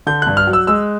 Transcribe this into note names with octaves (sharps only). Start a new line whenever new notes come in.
D3 G6
G2 F#6
F6
F#3
E6
G#3 E6